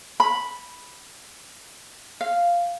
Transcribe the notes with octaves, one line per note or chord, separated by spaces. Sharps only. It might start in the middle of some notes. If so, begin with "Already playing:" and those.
B5
F5